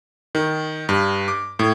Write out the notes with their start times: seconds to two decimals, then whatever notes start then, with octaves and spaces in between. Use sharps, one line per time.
0.35 D#3
0.89 G2
1.28 D6
1.59 A2